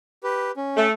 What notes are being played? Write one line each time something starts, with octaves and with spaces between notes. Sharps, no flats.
G4 B4
C#4
A3